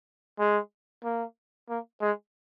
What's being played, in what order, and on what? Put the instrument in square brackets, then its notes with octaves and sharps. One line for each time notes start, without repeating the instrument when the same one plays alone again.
[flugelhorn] G#3
A#3
A#3
G#3